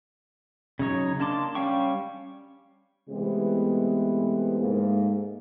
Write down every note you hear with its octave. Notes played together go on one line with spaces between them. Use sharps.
C#3 F#3 D#4 C#5
A#3 D4 A5 C6 D6
G3 C#4 F5 G5 C#6
C3 E3 G#3 A3 B3
G#2 A3 A#3